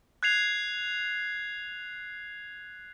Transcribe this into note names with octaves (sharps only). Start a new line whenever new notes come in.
F#6 G#6 C7 F7